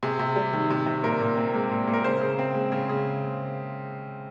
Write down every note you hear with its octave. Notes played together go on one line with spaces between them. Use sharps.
C3 G#4
C3
G3
D#3
C3
C3
A#2 A#4
A#2
C4
G#3
A#2
A#2
A#4
C#3 C5
C#3
C4
G#3
C#3
C#3